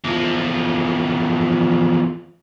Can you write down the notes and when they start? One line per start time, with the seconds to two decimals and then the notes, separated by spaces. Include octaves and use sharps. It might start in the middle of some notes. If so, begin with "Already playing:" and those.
0.04 E2 F3